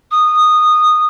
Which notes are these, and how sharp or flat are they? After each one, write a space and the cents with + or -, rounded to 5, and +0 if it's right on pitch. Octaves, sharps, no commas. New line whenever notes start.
D#6 -15